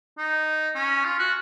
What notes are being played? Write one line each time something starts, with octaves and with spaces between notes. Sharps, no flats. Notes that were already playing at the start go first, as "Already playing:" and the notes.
D#4
C#4
F4
F#4